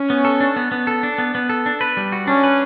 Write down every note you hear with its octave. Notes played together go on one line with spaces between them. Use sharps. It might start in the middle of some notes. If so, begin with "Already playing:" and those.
Already playing: C#4
B3
A4
D4
B3
B3
A4
D4
B3
B3
A4
D4
B4
G3
F#4
C#4 D4
B4